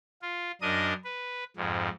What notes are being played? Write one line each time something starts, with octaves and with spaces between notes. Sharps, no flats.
F4
F#2 D4 A#4 D#5 D#6
B4
F2 G#2